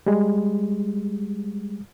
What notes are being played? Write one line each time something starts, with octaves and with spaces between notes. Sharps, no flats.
G3 G#3